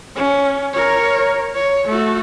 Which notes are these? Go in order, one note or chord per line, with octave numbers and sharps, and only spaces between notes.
C#4
A#4 C#5
C#5
A3 F#4